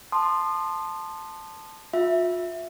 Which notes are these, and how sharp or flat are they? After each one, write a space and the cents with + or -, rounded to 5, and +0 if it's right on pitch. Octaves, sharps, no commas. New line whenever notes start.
A5 +0 C6 +0 D#6 -35
F4 +40 E5 +0